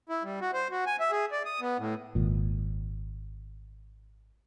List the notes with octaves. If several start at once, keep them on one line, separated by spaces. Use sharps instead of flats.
E4
G3
F#4
C5
F#4
G#5
E5
G#4
D5
D#6
B3
A2
G#1 A#2